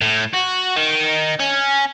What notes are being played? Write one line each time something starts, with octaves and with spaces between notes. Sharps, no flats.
A2
F#4
D#3
C#4